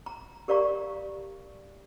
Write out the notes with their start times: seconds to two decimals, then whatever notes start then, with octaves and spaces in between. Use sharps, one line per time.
0.06 A#5
0.48 G4 A#4 D5 F5 A#5 C#6